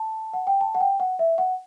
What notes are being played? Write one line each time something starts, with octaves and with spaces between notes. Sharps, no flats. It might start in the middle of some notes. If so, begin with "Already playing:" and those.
Already playing: A5
F#5
G5
A5
F#5
G5
F#5
E5
F#5